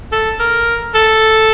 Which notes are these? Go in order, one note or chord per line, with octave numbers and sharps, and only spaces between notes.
A4
A#4
A4